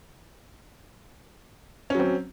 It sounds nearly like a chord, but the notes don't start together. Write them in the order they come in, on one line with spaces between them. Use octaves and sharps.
C#4 F#3 C4